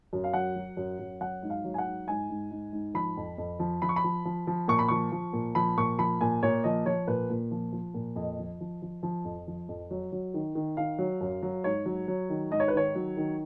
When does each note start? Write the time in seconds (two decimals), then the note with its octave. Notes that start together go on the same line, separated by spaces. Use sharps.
0.13 F#2
0.24 F5
0.33 F#3 F#5
0.56 F#3
0.77 F#2
0.99 F#2
1.20 F#3 F#5
1.42 G#2
1.50 F5
1.64 F#3
1.74 G#5
1.78 F#5
1.85 G#2
2.08 G#2 G#5
2.30 G#2
2.51 G#2
2.72 G#2
2.94 F3 B5
3.17 F2
3.38 F2
3.59 F3
3.82 F3 B5
3.89 C#6
3.96 B5
4.04 F3
4.25 F3
4.47 F3
4.68 A#2 C#6
4.79 B5
4.88 F3 C#6
5.12 F3
5.33 A#2
5.55 F3 B5
5.77 A#2 C#6
5.98 F3 B5
6.21 A#2 G#5
6.43 A#2 C#5
6.64 F3 D#5
6.86 F3 C#5
7.07 A#2 B4
7.30 A#2
7.51 F3
7.73 F3
7.94 A#2
8.16 F2 D#5
8.39 F3
8.60 F3
8.82 F3
9.03 F3
9.25 F2
9.47 F3
9.69 F2
9.90 F#3
10.12 F#3
10.34 D#3
10.55 D#3
10.77 D#3 F5
10.98 F#3
11.21 F#2
11.42 F#3
11.64 G#2 C#5
11.86 F#3
12.08 F#3
12.29 D#3
12.51 G#2 D#5
12.60 C#5
12.68 B4
12.73 D#3 C#5
12.95 F#3
13.17 D#3